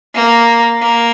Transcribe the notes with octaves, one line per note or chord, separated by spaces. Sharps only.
A#3
A#3